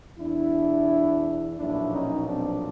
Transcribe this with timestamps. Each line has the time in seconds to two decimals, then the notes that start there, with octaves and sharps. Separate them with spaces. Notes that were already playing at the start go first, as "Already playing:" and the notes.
0.19 E2 B2 D4 E4
1.58 B1 A#2 F3 D4 E4
1.93 C#4 D#4
2.28 C4 D4